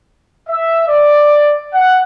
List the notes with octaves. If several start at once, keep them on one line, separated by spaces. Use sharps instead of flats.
E5
D5
F#5